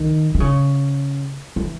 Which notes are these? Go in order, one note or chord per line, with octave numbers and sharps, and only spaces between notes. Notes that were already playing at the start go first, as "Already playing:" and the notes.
Already playing: D#3
D#3
C#3
E3